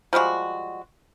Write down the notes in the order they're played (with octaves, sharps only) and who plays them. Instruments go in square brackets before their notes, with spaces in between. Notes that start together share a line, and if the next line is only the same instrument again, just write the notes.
[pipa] F3 G3 G#3 F#4